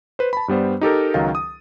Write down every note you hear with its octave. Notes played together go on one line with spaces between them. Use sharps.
B4 C5
A5 B5
G2 G3 B3 C5
D#4 G4 A4 A#4
C#2 D#3 F#3 D#4 F5 A6
D#6